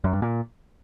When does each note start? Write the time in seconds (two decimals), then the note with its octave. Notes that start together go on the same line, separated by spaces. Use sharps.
0.04 F#2
0.13 G2
0.22 A#2